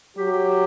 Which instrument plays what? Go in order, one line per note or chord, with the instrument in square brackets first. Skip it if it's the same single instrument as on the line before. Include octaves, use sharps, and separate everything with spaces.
[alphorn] F#3 [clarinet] G4